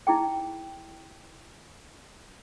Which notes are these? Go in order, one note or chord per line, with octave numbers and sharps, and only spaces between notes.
D#4 E4 G#4 G5